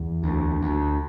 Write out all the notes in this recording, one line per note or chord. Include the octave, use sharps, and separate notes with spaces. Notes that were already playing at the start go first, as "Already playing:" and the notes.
Already playing: E2
D2
D2